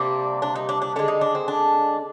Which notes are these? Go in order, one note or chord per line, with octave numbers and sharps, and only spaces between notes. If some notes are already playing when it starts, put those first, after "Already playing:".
Already playing: C3 G3 A#3 D4
D4
D#4
D4
D4
D3 G#3 D4
D#4
D4
C4
D4